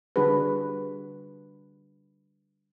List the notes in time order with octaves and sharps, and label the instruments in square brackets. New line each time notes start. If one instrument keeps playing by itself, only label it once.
[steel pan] D3 G3 D4 F#4 G#4 B4